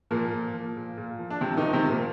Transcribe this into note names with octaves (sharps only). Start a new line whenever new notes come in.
A#2 F3 A#3
A#2
F3
A#2
A#2
F3
D4
C3 F3 C4
D#3 D#4
F3
C3 C4
F3
A#2 A#3